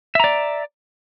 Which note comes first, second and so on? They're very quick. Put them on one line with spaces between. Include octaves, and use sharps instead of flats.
E5 A#5 D5